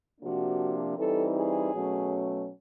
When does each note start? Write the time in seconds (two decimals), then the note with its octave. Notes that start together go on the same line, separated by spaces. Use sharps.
0.21 C3 F3 A#3 D4 F#4
0.97 E3 G3 C4 D#4 A4
1.35 G#4
1.73 B2 F#3 A3 C#4